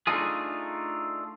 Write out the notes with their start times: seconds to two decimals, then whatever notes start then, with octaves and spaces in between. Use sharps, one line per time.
0.07 A3 D4 D#4 F4 G#4